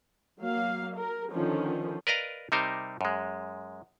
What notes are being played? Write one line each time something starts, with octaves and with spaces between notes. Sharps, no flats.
F#3 A#3 F5
A#4
D3 D#3 F3 C#4
A#4 B4 D5 D#5 F5 A#5
C3 G3 D#4 A#4 C5
F#2 G#3